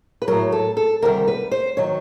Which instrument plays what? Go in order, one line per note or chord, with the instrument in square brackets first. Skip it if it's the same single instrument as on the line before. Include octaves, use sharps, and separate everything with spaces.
[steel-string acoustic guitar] B4
A2 F#3 A#4
A4
A4
D2 C3 D#3 G3 A#4
B4
C5
D#3 F#3 C#5